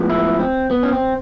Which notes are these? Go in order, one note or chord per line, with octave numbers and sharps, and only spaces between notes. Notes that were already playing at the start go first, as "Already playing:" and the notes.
Already playing: A2 F3 G#3 B3
E4
C4
B3
C#4
C4